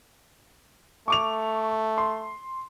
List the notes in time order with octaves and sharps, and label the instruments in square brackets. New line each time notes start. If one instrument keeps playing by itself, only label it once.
[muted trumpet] A3 [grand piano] C#6 D6 F7
[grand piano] C6